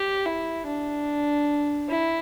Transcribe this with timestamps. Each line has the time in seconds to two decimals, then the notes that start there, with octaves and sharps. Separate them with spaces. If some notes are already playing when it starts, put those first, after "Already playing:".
Already playing: G4
0.25 E4
0.66 D4
1.89 E4